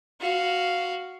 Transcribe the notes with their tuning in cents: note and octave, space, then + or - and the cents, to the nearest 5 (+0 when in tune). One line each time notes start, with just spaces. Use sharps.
F#4 +0 F5 +0